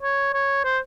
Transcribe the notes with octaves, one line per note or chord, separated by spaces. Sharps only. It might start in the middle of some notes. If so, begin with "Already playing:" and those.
C#5
C#5
C5